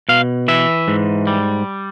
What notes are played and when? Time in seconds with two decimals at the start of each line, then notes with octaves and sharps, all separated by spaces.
0.09 B2 F5
0.48 E3 E5
0.88 G#2
1.27 G3